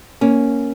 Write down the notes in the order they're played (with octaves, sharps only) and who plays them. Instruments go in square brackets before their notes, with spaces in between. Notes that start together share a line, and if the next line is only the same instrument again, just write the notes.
[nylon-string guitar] A#3 C#4